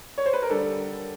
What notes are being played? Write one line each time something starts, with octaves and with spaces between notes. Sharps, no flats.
C#5
C5
B4
A#4
D3 G3 A4